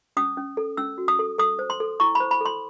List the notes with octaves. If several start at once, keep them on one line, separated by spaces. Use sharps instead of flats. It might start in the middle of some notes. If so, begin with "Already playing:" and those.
C#4 D#6
C#4
A4
C#4 E6
F#4
D#6
A4
A4 D#6
C5
C6
A4
E4 C#6
C5 B5
B5
A4 C6